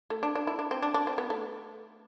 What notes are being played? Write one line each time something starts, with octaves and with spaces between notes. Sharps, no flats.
A3
D4
D4
E4
D4
C4
D4
D4
C4
B3
A3